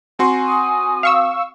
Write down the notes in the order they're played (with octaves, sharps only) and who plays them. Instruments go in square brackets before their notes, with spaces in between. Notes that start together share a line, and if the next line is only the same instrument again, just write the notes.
[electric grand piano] C4 F#4 C6 [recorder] G#5
[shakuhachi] D#6
[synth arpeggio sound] F5 C#6 E6